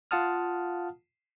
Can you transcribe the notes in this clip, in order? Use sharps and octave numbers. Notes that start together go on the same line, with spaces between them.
F4 F5 F#5 A5 D#6 F6